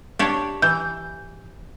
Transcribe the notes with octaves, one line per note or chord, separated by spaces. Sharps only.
D4 G4 C#5
E3 G6